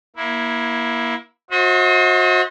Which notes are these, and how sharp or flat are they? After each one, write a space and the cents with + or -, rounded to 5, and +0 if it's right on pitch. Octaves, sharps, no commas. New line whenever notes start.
A#3 +25 E4 +0
F#4 -30 C5 +30 D#5 +40